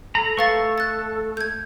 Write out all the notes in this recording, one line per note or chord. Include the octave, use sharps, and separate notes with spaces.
A4 A#5 B5
A3 A4 B4 F5 C#6 A6
F#6 A6
G6 G#6